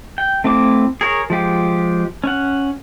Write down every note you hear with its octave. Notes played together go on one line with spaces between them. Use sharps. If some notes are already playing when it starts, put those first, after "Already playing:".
G5
A3 C4 E4 D6
G#4 A#4 C#5
F3 G#3 G4
C#4 F#5